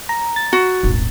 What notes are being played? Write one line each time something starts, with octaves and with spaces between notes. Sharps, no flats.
A#5
A6
F#4
D#1 G#1